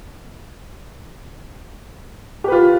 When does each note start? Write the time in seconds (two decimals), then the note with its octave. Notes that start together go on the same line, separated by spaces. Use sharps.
2.44 G4
2.48 B4
2.52 F4